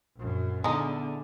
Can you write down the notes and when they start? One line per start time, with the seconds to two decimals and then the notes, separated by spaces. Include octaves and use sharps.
0.16 A#1 F#2
0.64 D3 G#3 B3 D#4 E4 G#5